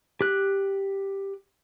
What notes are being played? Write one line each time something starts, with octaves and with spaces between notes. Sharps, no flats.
G4 F#6